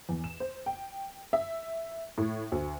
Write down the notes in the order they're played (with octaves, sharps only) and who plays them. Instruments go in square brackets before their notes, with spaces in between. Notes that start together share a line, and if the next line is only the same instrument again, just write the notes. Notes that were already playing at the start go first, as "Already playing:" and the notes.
[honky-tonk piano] E2
E7
C5
G5
E5
A2
D2